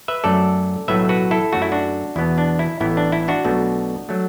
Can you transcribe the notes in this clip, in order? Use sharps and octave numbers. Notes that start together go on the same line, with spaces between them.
B4 E5
F#2 F#3 A3 A4 D5
B1 A2 F#3 A3 B4 E5
F#4 B4
E4 A4
F#2 F#3 A3 F#4
E4
D4 F#4
E2 B2 B3 E4
D4
E4
A1 A2 E3 B3 E4
D4
E4
D4 F#4
B1 B2 A3
F#3 A3